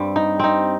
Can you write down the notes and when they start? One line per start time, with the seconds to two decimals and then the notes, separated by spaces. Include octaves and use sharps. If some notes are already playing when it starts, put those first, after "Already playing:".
Already playing: G2 G3 C4
0.16 D#4
0.39 C4 D#4